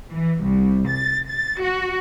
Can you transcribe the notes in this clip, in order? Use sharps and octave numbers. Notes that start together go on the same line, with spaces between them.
E3
C2
A6
A6
F#4